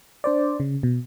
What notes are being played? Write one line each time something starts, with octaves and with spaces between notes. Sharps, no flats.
D4 C5 D5
C#3
B2